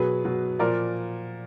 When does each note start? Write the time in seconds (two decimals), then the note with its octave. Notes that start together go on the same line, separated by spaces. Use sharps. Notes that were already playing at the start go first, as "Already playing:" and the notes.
Already playing: B2 F#3 G#4 B4
0.25 B2 F#3
0.59 A#2 F3 A#4 D5